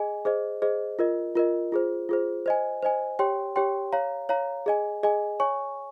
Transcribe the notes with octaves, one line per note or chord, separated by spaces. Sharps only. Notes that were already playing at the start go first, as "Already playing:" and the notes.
Already playing: G#4 D#5 G#5
G#4 C5 D#5
G#4 C5 D#5
F4 A#4 D#5
F4 A#4 D#5
F4 G#4 C5
F4 G#4 C5
C5 D#5 G#5
C5 D#5 G#5
G4 C#5 G5 C6
G4 C#5 G5 C6
C#5 F5 A#5
C#5 F5 A#5
G#4 D#5 G#5
G#4 D#5 G#5
C#5 G#5 C#6